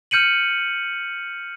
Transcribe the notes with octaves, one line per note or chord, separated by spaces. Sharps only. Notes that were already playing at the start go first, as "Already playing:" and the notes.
F6 G6 C#7 D#7 F#7